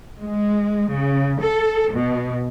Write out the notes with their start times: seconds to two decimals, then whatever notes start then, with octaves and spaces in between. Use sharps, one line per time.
0.20 G#3
0.91 C#3
1.42 A4
1.93 B2